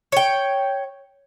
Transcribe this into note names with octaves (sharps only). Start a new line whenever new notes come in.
C#5 G5